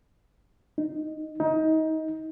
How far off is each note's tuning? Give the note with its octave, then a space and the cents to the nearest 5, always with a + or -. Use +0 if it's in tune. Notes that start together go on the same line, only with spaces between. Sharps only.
D#4 -5
D#4 +25